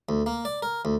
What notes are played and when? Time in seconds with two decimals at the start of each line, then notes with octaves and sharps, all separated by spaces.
0.09 D2
0.26 A#3
0.45 D5
0.62 A#4
0.85 D2